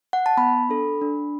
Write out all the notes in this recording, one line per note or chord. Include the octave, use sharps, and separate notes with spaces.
F#5
A5
B3 B5
D4 A4
D4